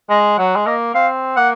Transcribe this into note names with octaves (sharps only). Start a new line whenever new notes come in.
G#3 D#5
F#3 F#5
G#3
A#3 D#5
C4 F5
A#3 F#5